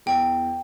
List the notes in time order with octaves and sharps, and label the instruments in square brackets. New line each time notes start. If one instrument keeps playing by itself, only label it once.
[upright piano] E2 [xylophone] G5